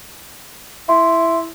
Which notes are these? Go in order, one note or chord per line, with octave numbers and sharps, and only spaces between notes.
E4 C6